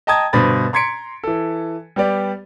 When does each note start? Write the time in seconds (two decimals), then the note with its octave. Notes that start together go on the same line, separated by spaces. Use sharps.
0.07 D#5 G5 A5 A#5 D#6 G#6
0.33 G2 B2 D3 C5 B5 A6
0.73 A#5 C6 G#6 B6 C#7 D7
1.24 E3 A4
1.96 G3 B3 G4 D5